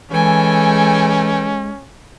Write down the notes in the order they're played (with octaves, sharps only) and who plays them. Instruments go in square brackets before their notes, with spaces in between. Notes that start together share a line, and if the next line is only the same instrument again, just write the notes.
[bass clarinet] E3 [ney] G#3 [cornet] C#4 [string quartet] A4 G5 G#5